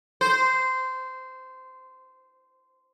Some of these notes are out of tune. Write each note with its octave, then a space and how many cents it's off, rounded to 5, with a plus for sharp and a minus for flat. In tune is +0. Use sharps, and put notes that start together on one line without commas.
C5 -15